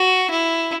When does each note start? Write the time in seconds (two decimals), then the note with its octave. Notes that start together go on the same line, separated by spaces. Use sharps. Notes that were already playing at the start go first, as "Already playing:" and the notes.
Already playing: F#4
0.31 E4